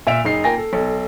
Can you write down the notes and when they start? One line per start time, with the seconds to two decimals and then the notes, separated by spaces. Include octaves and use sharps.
0.07 A#2 E5 D7 F7
0.25 F#1 D#4 C7
0.44 A#3 F4 A#4 G5 G#5 A#6
0.58 A4
0.73 B1 A4